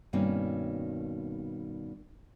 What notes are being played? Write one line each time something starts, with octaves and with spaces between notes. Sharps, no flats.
G2 B2 D#3 A#3 C4 C#4